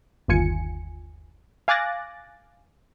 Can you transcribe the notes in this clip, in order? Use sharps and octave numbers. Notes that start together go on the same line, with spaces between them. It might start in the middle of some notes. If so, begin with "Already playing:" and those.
G1 D#2 F4 G#5 C#7
F5 G#5 D6 F#6 A6 A#6